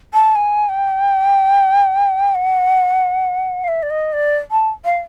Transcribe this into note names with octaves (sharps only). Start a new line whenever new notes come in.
A5
G#5
G5
F#5
F5
E5
D5
D#5
D5
A5
F5